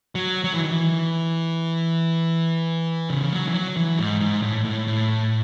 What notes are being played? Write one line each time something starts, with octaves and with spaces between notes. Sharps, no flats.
F#3
F#3
E3
D#3
E3
C#3
F#3
E3
F#3
E3
G#2
G#2
A2
A2
A2